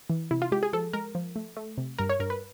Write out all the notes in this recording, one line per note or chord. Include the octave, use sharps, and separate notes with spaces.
E3
C3 E4
F4
G#3 G4
G#4
F3 A4
G#3 A#4
F3
A3
A3
C3
G2 A#4
C#5
G2 A#4
B4